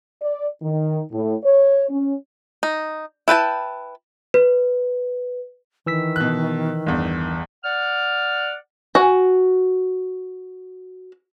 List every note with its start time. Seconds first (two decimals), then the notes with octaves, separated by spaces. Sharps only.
0.22 D5
0.62 D#3
1.12 A2
1.44 C#5
1.89 C#4
2.63 D#4
3.28 E4 B4 G5 A5
4.34 B4
5.87 D#3 E3 E6 B6
6.16 B2 F#6
6.86 G1 E2
7.64 D5 F#5 F6
8.95 F#4 G#5